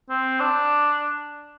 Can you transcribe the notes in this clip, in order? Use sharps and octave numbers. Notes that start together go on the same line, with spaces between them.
C4
D4